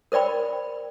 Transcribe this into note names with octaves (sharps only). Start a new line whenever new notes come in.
A#4 C5 D5 G5 B5